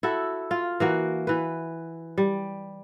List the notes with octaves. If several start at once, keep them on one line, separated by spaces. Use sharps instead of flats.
E4 F#4 A4
F4
E3 A#3 F#4
E3 B4
G3